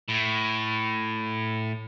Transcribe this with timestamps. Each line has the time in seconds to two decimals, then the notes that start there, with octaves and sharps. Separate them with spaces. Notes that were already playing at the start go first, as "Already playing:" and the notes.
0.08 A2